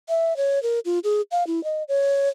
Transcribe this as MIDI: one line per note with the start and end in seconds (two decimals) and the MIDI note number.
0.09 0.36 76
0.37 0.62 73
0.63 0.79 70
0.85 0.99 65
1.04 1.21 68
1.31 1.46 77
1.47 1.63 64
1.64 1.83 75
1.88 2.29 73